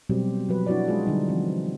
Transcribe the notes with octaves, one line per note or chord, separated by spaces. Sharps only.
B2 F#3 G3 C4 G4
F3 F#3 B4
D4 E4 F#4 C#5 D5
G#3 C#4 F4 G#4
D3 F#3 G3 D#4
E3 F3 C4